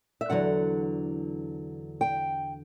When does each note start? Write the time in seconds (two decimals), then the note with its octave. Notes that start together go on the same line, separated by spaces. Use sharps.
0.21 E5
0.30 E2 D3 F#3 F#5
2.01 G5